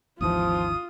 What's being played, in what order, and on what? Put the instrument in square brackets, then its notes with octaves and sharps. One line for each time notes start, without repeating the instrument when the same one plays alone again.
[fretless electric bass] G#1 D#2 E3 [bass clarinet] F3 [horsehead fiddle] F4 [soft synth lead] D#6